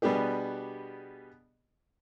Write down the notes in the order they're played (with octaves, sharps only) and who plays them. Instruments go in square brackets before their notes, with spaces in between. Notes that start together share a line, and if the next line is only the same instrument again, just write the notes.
[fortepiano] B2 G3 B3 D4 G4 G#4